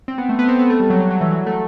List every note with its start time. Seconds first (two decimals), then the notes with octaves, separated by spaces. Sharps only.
0.08 C4
0.18 B3
0.29 A3
0.39 B3
0.49 C4
0.59 B3
0.70 A3
0.80 G3
0.90 F#3
1.00 A3
1.11 F#3
1.21 E3
1.31 F#3
1.46 A3